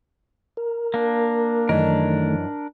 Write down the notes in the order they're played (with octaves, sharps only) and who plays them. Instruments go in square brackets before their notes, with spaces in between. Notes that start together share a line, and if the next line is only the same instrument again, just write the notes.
[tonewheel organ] A#4
[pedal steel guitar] A#3 D4
[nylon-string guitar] F#2 E3 D#5 [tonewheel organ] D#3 A3 [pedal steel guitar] D4 A#4